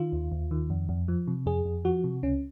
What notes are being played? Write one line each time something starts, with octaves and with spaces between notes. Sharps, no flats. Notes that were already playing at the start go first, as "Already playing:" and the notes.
Already playing: D#3 F4
D#2
D#2
D#3
F2
F2
F3
C3
F2 G#4
F2
F3 F#4
C3
C#2 C#4